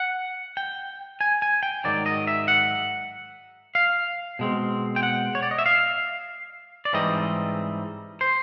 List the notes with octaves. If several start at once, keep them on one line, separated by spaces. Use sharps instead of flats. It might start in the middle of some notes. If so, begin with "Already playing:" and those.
Already playing: F#5
G5
G#5
G#5
G5
G#2 D#3 F#3 D5
D#5
E5
F#5
F5
B2 G#3 C4
G5
F#5
C#5
D5
D#5
E5
F5
D5
G#2 E3 G3 C4 D#4 D#5
C5